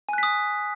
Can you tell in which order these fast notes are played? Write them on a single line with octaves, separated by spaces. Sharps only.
G#5 F#6 B6 D#6